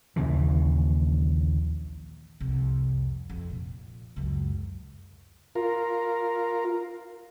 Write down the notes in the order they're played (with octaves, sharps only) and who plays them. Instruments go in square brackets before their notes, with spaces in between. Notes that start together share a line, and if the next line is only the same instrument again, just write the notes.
[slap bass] A#1 D#2 C#3 E3
[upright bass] C2 F2
F2
A#2
C#2 F#2
[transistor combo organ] F4 A#4